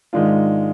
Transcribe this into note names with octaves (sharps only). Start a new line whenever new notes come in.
G#2 D#3 G#3 D4 F4